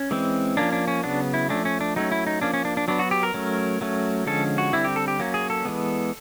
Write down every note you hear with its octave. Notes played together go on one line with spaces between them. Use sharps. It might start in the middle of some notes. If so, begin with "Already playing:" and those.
Already playing: C#4
E3 G#3 C4
F3 A#3 C#4 D4
D4
C#4
C#3 F#3 B3 D4
E4
F3 A3 C#4 D4
C#4
D4
F#3 A3 C#4 D#4
E4
D#4
F3 A#3 C#4 D4
C#4
D4
D4
F#3 B3 D4
F#4
G4
A#4
F#3 A3 C#4
F#3 A3 C#4
D3 F3 G#3 C#4 A4
F#4
D3 G3 C4 E4
G4
A4
G4
F#3 A#3 C#4
G#4
A4
E3 G#3 B3